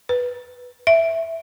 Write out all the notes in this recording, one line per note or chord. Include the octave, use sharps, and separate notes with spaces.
B4
E5